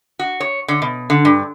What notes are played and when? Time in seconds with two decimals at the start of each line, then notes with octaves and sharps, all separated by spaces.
0.19 F#4
0.40 C#5
0.68 D3
0.82 B2
1.10 D3
1.25 G2